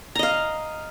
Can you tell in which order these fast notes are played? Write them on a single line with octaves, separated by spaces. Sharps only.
A#5 D#5 F5